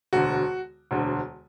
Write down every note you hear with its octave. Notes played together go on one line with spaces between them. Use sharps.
E1 D2 D3 F#4
E1 D2 D3